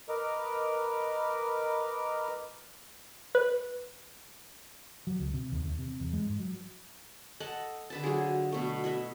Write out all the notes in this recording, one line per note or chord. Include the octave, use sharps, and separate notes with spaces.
A#4 B4 D#5 D6 F6
B4
F#3
C#2
C3
D#2
D#2
C3
E2
G#3
G#2
F#3
A4 D#5 F#5 A5
D3 B4 A5
F#3 F4 G#4
B2 A3
E4 B4 D#5 E5